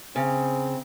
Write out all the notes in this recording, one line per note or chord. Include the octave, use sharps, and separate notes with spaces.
C#3 C4